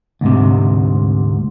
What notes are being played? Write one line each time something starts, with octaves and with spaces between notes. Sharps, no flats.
D2 G#2 C3